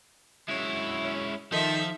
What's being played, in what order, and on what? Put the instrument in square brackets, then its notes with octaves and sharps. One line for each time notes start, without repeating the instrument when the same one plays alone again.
[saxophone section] F#2 C#5 E5 [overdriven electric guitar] G#3 E4
[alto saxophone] C#4
[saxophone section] D#3 [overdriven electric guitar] F3 [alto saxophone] D#4 [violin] A4 E5